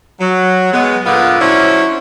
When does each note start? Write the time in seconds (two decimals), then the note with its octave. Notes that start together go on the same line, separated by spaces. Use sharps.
0.20 F#3
0.72 G#3 B3
1.05 A#2 D3 B3 F4 B4
1.40 F#3 C#4 D4 E4 C5